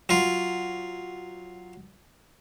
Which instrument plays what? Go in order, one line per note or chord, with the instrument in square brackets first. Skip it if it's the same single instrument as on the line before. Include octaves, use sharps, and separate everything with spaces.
[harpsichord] F#3 F4